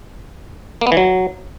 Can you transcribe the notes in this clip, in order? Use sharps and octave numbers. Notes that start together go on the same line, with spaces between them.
A#3
B3
E3
F#3